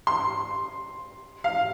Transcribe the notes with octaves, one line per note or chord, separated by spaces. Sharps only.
C6
F5